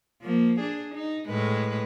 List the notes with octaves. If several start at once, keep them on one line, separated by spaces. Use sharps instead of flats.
F3 A#3
D4 G#4
D#4
A2 G#3 B4